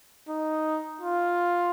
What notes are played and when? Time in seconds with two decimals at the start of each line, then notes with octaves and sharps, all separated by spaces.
0.29 D#4
1.01 F4